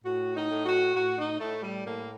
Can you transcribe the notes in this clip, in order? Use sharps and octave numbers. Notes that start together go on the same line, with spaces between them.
A2 F#4
D#4
A2
F#4
A2 F#4
D#4
A2 A3
G3
A2 A#3